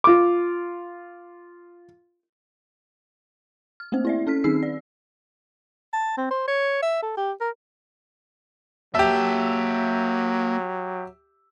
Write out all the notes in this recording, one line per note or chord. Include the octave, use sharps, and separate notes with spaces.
F4 D6
F6
A3 A#3 C4 C5
E4 D5 E5
C#4 A4 F6 B6
D#3 C4 D#4 G#4 E6 C7
D5
A5
C4
C5
C#5
E5
A4
G4
A#4
F#3 A#3 G4 E5 A5